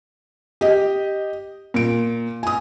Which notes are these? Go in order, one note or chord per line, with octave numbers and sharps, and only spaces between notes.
G4 D#5
A#2 D7
G#5 D#6